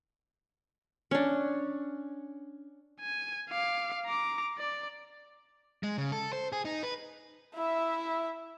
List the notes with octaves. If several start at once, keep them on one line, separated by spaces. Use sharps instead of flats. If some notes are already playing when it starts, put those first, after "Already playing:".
C#4 D4
G#5
F5 D6
A#5 D6
D5
G#3
C#3
A4
C5
G#4
D#4
B4
E4 E5